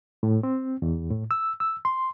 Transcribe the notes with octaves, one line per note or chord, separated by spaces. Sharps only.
A2
C4
E2
A2
E6
E6
C6